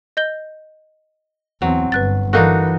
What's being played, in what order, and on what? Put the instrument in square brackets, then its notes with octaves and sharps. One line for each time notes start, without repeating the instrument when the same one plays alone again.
[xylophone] D#5 G6 G7
[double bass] E2 C4 [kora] F#3
[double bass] G1 [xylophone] B4 F#6 A6
[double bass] E3 [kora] D4 D#4 F#4 [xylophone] A4 A#4 F5